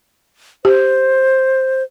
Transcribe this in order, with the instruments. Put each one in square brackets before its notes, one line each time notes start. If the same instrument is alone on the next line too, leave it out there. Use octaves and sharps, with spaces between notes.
[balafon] G4 [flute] C5